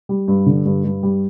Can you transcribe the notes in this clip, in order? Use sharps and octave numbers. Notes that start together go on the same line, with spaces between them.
G3
G2
D3
G2
G2
G3